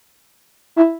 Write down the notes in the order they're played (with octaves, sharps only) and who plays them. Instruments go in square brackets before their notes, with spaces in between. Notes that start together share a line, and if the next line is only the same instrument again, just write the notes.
[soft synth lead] E4